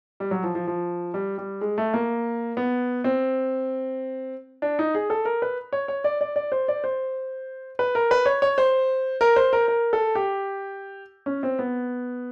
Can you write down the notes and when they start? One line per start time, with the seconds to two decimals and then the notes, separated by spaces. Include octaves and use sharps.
0.20 G3
0.31 F#3
0.44 F3
0.55 F3
0.67 F3
1.14 G3
1.38 G3
1.61 G#3
1.78 A3
1.94 A#3
2.57 B3
3.04 C4
4.62 D4
4.79 D#4
4.95 G#4
5.10 A4
5.25 A#4
5.42 B4
5.73 C#5
5.88 C#5
6.04 D5
6.21 D5
6.36 D5
6.52 C5
6.68 D5
6.84 C5
7.79 B4
7.95 A#4
8.11 B4
8.26 C#5
8.42 C#5
8.58 C5
9.21 A#4
9.36 C5
9.53 A#4
9.68 A#4
9.93 A4
10.15 G4
11.26 C#4
11.43 C4
11.59 B3